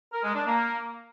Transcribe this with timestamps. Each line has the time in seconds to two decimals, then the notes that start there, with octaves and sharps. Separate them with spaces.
0.13 A#4
0.24 G#3
0.35 D4
0.45 A#3